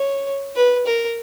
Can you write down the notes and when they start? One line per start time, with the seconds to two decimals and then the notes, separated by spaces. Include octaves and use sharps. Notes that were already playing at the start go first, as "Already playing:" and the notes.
Already playing: C#5
0.56 B4
0.86 A#4